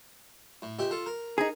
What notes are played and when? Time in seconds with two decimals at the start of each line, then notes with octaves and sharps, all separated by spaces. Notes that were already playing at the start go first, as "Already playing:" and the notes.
0.62 A2
0.79 C#2 G4 E5
0.91 F4 A4
1.06 A#4
1.38 D#4 G#4